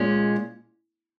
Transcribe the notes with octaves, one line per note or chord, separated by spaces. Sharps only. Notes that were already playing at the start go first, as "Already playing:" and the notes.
Already playing: A#2 G#3 C#4